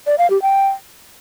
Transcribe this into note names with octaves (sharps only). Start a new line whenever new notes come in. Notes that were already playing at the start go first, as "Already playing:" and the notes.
D5
F5
G4
G5